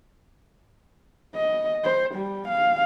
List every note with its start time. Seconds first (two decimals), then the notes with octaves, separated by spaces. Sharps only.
1.35 D#5
1.84 C5
2.15 G3
2.48 F5